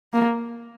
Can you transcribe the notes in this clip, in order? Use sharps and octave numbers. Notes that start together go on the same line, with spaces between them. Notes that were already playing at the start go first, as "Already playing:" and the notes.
A#3